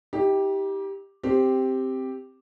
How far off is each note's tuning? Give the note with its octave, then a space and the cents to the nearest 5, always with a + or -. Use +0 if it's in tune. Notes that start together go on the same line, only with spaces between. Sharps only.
D#4 +45 G4 +0
C4 +0 G4 +0